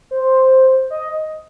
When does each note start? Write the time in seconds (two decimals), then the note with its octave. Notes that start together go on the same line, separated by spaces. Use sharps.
0.11 C5
0.90 D#5